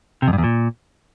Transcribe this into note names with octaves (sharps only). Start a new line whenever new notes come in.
C3
F2
G2
E2
A#2